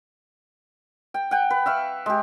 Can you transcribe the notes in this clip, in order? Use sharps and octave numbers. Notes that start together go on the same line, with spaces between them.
G5
F#5 G5
B4
E5 F5 C#6
G#3 G4